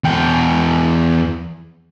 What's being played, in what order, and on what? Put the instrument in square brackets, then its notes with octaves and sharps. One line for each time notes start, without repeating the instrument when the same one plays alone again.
[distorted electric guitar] E2 G5